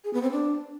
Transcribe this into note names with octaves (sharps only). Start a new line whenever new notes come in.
G#4
B3
C4
D4